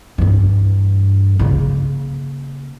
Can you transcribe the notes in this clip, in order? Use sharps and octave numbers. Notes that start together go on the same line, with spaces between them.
G2 E3
C#3 A#3